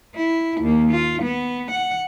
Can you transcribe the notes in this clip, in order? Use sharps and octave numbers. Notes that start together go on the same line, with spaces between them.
E4
D#2 A#3
F4
B3
F#5